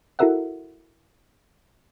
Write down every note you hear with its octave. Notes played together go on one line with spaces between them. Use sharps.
E4 F#4 A4 A#4 E5 F#5